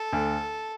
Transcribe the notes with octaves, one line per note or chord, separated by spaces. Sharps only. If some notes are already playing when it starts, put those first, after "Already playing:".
Already playing: A4
D2